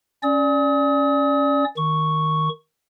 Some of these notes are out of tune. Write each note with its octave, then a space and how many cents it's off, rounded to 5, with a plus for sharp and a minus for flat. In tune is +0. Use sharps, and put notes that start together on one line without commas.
C#4 +0 D5 +0 D#6 +40
D#3 +0 C#6 +0